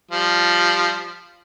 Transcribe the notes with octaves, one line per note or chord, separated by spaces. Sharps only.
F3 G3